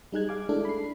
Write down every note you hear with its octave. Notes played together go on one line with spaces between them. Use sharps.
G3 D#4 G#4 F#6 G#6
F5 G#5 D6
G#3 A3 D4 E4 A4
B5 C7